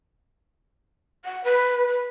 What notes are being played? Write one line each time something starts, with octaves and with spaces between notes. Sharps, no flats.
F#5
B4
B4